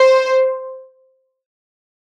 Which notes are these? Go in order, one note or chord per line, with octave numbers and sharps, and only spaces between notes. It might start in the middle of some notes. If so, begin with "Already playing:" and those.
Already playing: C5